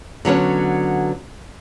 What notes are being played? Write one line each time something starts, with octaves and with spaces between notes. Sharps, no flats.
D3 F#3 B3 C#4